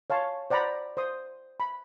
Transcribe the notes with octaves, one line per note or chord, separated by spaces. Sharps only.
C#5 F5 A5 C6 C#6
C5 D5 F#5 A#5 B5
C5 C6 D#6
B5